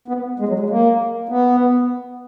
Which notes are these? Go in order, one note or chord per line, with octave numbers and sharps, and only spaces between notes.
B3
G#3
F#3
G#3
A#3
B3